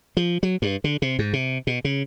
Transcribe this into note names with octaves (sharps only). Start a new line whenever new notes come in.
F3
F#3
G2
D3
C3
G#2
C3
B2
C#3